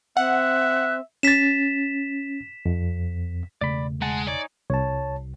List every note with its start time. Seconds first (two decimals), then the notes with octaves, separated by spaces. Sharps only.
0.17 C4 E5 F#5 F#6
1.23 C#4 A6 B6 E7
2.66 F2
3.61 E1 C#3 A3 D5 B5
4.02 G#3 F#5 G#5 A5
4.27 D#4 C#5 D5 G#5
4.70 C2 C#5 A5